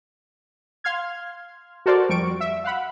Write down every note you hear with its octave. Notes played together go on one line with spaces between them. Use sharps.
F5 C6 F6 G#6
F#4 A4 A#4 C5 D5
F2 G3 C#6 D7
E5
F5 F#5 B5